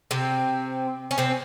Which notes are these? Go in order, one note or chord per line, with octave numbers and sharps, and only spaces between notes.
C3 C4
C#4
C3 C4